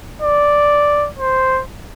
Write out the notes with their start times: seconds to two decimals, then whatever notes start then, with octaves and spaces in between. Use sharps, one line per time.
0.22 D5
1.18 C5